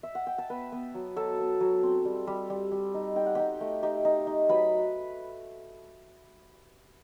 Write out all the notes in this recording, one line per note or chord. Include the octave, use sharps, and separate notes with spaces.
E5
F#5
G5
A5
B3 B4 B5
B3
F#3
F#3 A4 A5
B3
F#3
C4
G3
G3
G3
G3
D#4
D#4 G5
F#5
D#4 G4 G5
A3
D#4 G4 G5
D#4
D#4
F#3 B4 B5